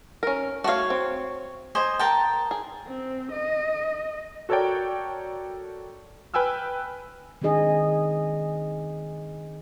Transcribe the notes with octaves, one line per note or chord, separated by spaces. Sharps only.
C#4 A#4
A3 F#4 C#5 F5
C4
C5 D#5 G#5
A#4 G5 A5
G#4
C4
D#5
F#4 A4 A#4 C#5 D5 G5
B4 G5 G#5 E6 F6
D#3 C4 D4 D#4 G#4 D#5